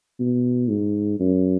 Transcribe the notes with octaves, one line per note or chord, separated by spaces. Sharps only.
B2
G#2
F#2